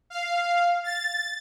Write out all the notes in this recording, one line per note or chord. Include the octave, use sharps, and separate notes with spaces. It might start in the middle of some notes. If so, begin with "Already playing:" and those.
F5
A6